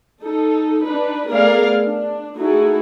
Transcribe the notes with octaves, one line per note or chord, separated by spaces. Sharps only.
D#4 A4
D4 D#4 B4
A3 B3 G#4 A#4 D5 F5
D4
A3 D#4 E4 F#4 G#4 A4